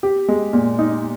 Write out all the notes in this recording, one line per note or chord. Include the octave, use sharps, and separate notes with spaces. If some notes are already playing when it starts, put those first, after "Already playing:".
G4
G#3
A#2
D#4